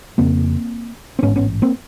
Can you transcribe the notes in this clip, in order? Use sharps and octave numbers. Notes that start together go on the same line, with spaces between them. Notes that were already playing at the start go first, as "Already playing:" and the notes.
F1 F2 C#3 A#3 C4
C4
A1 G#2 B3 C#4
B3 C#4
A#3 C4